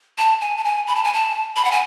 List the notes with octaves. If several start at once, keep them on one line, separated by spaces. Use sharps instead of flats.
A5
G#5
A5
G#5
B5
A5
G#5
A5
B5
F#5
G#5